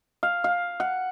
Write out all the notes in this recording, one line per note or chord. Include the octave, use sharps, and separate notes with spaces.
F5
F5
F#5